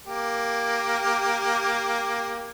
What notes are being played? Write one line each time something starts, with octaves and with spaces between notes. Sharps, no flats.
A#3 G4